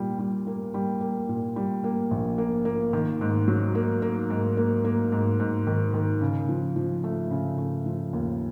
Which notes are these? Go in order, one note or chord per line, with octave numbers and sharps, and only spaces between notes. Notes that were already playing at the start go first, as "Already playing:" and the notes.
Already playing: A#2 G3
G3
A#3
G3
A#3
A#2
G3
A#3
A#1
A#3
A#3
D#3
G#2
F#3
A#3
A#3
G#2
A#3
A#3
G#2
G#2
D#3
D#3
C#3
F3
F3
A3
C#3
A3
F3
D#2